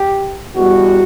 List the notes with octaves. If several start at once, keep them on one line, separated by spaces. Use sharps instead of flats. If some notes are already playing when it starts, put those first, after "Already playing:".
Already playing: G4
E2 B2 G3 F#4